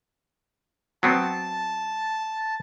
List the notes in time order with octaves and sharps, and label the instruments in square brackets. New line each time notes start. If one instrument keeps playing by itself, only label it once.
[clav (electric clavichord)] F#3 B3 C4 [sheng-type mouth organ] A5